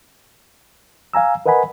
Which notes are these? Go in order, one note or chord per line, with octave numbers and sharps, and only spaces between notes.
F5 G#5 A#5 E6
A#4 B4 D#5 F#5 G#5 B5